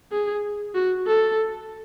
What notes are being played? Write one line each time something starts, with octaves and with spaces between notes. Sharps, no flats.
G#4
F#4
A4